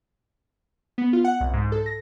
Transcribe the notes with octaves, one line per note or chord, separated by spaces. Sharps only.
B3
F4
F#5
C2
G#2
A4
A#6